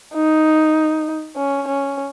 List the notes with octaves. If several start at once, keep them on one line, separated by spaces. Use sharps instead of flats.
D#4
C#4
C#4